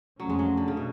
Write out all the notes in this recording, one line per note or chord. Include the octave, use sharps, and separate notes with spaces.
F#1 F2 F3 F#3 A3 C#4
G#3
F#3
D3
C#3
B2